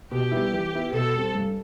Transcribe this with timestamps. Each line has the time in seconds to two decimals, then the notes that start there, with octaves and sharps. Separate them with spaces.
0.11 B2 G4
0.31 G3 B3 E4
0.53 E3
0.73 B3 E4
0.93 B2 A4
1.14 G3 C4
1.35 G2